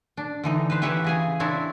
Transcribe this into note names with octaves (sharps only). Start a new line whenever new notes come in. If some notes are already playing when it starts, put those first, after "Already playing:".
D4
D3 E3 D#4
B4 C5
E3 G4 B4 C#5 E5 F#5
C#3 G#4 G#5
C4 D4 E4 C#5